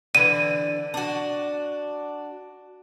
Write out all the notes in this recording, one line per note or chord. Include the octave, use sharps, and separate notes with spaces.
D3 E3 D#7
D4 F#4